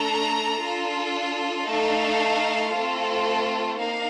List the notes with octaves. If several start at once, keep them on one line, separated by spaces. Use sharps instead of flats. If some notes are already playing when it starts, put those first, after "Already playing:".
Already playing: A3 D4 A4 A#5
D4 F4 A4
A3 D#4 A4 F5
A3 C4 F4 A4
A#3 D#4 F5